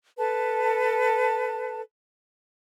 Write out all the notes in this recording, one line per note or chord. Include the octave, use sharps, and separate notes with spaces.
A4 B4 A5